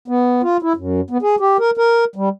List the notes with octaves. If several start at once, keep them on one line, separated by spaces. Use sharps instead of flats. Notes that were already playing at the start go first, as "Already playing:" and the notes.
B3
F4
E4
F#2
B3
G#4
G4
A#4
A#4
G3